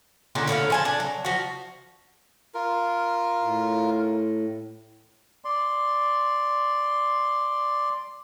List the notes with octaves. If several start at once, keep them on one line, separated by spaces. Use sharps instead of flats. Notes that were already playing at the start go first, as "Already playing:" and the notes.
A#2 D3 C#4 D#4
A2 D3 C#5 F5
F3 G#5 A5
D4
F#3
F3 F#4
F4 A#4
A2
D5 C6